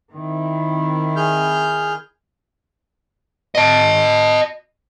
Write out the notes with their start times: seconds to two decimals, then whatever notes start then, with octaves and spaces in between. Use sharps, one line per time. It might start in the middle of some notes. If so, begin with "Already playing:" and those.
0.12 D#3 C4 E4
1.16 G#4 F6 G6
3.55 D#5 A5